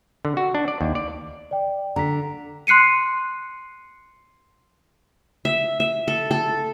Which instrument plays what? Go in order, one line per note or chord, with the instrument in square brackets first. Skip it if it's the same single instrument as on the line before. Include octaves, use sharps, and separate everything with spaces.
[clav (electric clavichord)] D3
F#4
D4
D5
D#2
D5
[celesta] D5 G5
[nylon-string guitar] D3 [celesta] A#5 B6
[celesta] C6 F#6 C7 C#7 D#7
[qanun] E5
E5
A4
A4